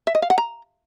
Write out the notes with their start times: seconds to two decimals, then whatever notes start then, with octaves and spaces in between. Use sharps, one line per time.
0.07 E5
0.15 D#5
0.22 F5
0.30 F#5
0.38 A#5